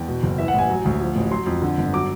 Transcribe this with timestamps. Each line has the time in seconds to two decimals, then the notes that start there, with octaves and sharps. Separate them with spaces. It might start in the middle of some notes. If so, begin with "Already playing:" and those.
Already playing: E2 G5
0.08 B2
0.23 F#1
0.38 E3 E5
0.48 F#5
0.54 A1 G#5
0.70 F#3
0.85 D2
1.01 F3
1.16 A1
1.31 F#3 C6
1.46 F2
1.62 D3
1.77 G1
1.93 F#3 D6